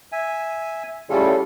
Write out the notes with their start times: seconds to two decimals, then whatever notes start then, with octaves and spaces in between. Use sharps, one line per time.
0.12 E5 G#5
1.10 A2 C#3 G3 C#4 F4 A4